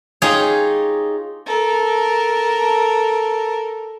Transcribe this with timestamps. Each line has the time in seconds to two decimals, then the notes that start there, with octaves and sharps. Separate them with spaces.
0.22 D#4 F4 G4 G#4 C#5
1.46 A4 A#4